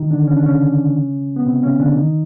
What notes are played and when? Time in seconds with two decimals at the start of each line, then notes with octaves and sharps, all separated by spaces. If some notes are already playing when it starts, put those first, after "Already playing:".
Already playing: D#3 D#4
0.11 D3 D4
0.28 C#4
0.37 D4
0.46 C#3 C#4
1.36 B3
1.45 C3 C4
1.63 C#3 C#4
1.79 D3 D4
1.97 D#3 D#4